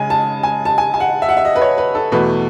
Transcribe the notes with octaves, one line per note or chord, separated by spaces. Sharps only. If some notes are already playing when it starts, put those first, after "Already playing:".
Already playing: C#3 G#3 G#5
A5
G#5
A5
G#5
G#5
F#5
E5
F#5
E5
D#5
B4
C#5
B4
A4
E2 B2 A3 B4